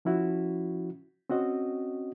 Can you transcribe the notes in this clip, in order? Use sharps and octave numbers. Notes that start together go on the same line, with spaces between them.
F3 C#4 E4 F#4
C4 C#4 F#4 D#5